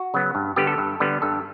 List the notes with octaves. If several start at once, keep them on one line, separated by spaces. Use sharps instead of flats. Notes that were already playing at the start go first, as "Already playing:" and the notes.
Already playing: F#4
C#3 F#3 B3
G2
D3 G3 B3 G4
A4
G2
D3 G3 B3
G2 A4